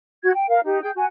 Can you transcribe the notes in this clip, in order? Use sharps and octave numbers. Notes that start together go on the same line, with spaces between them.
F#4 G#6
G5
A#4 F5
D#4 G4
G#4 G5 G6
F#4 G#5